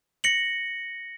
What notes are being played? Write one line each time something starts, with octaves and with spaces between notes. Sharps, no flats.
A#6 C#7 F#7